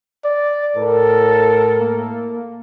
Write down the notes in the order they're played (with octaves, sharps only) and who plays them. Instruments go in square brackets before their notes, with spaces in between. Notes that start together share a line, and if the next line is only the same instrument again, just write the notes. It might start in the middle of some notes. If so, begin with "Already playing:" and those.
[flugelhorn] D5
[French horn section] A2 A#4 [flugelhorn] A4
[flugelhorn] A#3